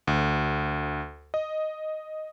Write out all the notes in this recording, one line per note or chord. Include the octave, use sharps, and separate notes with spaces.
D2
D#5